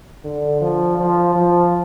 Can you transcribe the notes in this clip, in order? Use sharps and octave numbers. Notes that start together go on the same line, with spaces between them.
D3
F3
F3
F3